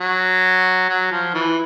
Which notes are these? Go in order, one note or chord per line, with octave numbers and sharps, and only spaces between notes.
F#3
F#3
F3
E3